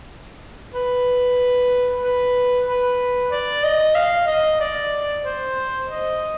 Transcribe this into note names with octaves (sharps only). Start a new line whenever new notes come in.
B4
B4
B4
D5
D#5
F5
D#5
D5
C5
D#5